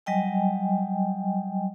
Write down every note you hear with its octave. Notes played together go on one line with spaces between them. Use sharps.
F#3 G3 D#5 G5 G#5